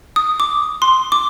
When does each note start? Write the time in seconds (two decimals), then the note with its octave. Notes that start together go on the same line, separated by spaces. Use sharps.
0.16 D#6
0.40 D6
0.82 C6
1.12 D6